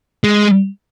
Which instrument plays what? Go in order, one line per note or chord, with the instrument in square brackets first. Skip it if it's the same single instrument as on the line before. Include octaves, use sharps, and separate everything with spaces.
[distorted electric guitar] G#3